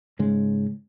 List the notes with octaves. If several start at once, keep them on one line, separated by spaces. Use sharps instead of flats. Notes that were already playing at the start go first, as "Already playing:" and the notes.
G#2 C#3 G#3